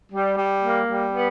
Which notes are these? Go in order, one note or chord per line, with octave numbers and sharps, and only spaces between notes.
G3
G3
A#3
G3
B3